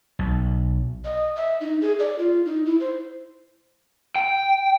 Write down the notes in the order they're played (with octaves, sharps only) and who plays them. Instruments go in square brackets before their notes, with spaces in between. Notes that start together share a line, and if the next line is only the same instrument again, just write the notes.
[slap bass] B1
[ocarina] D#5
E5
D#4
G#4
D5
F4
D#4
E4
C5
[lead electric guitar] G5